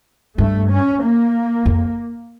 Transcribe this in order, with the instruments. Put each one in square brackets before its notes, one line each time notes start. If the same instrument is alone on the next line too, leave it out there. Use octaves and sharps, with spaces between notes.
[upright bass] G2 [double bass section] A3
[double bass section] C#4
A#3
[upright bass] F2